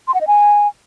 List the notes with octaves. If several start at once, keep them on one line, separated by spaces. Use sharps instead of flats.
C6
F#5
D#5
G#5